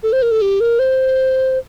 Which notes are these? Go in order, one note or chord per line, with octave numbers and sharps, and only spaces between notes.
A4
C5
A#4
A4
G4
A#4
C5